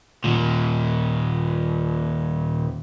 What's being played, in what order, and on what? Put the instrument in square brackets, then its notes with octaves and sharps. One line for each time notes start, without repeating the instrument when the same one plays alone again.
[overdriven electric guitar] D#2 A#2